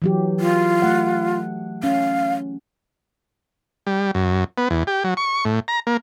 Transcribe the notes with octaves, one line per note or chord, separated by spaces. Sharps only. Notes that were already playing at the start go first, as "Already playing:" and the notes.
E3 F#3 G4
F4
A3 F#5
C#4 F5
G3
F#2
B3
E2
G4
F#3
C#6
A2
A#5
A#3